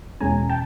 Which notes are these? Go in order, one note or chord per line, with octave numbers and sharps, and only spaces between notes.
E2 B2 G#3 C#4 G#5 A#5
G5 A5